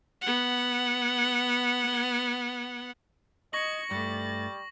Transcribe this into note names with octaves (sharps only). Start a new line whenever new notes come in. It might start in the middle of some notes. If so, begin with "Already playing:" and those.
B3 F#5
D#5 C#6 G#6 A#6 C#7 F#7
G2 G3 A3 A6